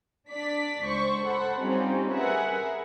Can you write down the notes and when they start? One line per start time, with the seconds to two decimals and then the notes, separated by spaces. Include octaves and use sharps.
0.28 D4 D5 B6
0.85 C#2 C5 C#6
1.24 A4 C5 F#5 B5
1.58 G3 C4 C#4 D#4 F4
2.11 G#4 A#4 B4 E5 F#5